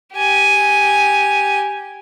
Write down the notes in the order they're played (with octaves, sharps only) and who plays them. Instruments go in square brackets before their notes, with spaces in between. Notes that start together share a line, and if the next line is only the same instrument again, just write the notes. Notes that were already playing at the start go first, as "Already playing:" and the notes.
[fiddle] G4 G#5